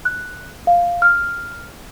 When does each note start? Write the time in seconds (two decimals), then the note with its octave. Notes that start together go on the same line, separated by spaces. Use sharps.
0.05 F#6
0.67 F5
1.02 F6